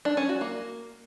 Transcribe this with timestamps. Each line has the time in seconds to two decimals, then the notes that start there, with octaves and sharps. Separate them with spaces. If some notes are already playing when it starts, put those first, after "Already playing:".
0.05 D4
0.17 C#4
0.29 F#4
0.41 A#3